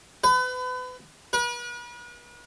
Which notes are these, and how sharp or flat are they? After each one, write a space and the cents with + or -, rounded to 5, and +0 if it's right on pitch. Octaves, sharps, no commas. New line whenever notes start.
B4 +35
B4 -40